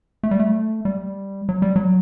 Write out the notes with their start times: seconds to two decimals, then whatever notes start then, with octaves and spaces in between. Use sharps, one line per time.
0.23 A3
0.31 G3
0.39 A3
0.85 G3
1.49 F#3
1.62 G3
1.76 F#3